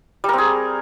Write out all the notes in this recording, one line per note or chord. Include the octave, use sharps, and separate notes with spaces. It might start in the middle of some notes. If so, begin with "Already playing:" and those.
G3 C4 G#4 A#4